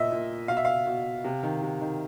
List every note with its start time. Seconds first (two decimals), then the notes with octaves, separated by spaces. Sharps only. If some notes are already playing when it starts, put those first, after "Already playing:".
Already playing: A#2 D#5 E5
0.12 A#2
0.48 B2 F5
0.57 E5
0.65 F5
0.87 B2
1.24 C3
1.43 D#3
1.62 C3
1.80 D#3